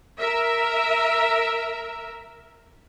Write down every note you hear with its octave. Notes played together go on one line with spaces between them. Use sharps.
A#4 E5